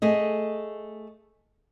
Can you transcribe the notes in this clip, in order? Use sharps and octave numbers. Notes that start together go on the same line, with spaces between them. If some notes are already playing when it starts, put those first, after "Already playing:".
A3 G#4 D#5